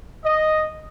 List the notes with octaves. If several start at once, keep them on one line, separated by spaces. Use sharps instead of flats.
D#5